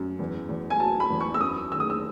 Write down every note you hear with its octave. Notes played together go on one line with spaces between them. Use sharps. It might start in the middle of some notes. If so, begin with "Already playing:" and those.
Already playing: F#2
E2
E2
G#5
F#3 A5
B5
E2
C#6
E6
F#2 D#6
D#3 E6
D#6
E6